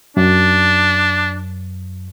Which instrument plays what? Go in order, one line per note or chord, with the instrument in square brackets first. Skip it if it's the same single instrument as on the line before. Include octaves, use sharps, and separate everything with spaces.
[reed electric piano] F#2 [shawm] D4